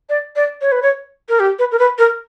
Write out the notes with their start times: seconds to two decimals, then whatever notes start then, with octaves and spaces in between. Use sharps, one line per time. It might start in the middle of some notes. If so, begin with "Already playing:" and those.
0.09 D5
0.36 D5
0.61 C#5
0.72 B4
0.82 C#5
1.29 A#4
1.40 G4
1.59 B4
1.72 A#4
1.79 B4
1.99 A#4